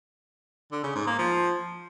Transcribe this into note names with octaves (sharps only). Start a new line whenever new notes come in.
D3
C#3
G#2
A#3
F3